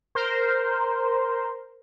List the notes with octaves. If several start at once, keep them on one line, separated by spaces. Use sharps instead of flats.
A#4 C5